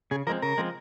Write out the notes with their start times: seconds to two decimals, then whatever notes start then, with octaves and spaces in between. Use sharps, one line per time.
0.11 C#3 G#4
0.27 F3 A#4
0.29 G#3 C4
0.42 C#3 A#4
0.58 F3 G#3 C4